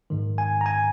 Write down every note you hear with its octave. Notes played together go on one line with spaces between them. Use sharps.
A#1 G#2 D#3
G#5
A#5
G#5